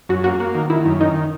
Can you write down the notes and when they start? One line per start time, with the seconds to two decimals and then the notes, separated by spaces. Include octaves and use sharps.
0.09 F#2 F#4
0.24 A#3 F#4
0.40 A#3 F#4
0.54 D#3
0.70 D#3 E4
0.86 F#2
1.00 D#3 D#4